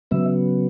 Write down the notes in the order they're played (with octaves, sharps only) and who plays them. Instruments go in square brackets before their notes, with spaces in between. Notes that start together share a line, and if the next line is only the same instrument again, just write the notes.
[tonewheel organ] C#3 F#3 B3 E5